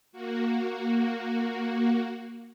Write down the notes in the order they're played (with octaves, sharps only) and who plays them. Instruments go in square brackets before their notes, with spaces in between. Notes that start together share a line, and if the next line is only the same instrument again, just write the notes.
[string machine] A#3 F#4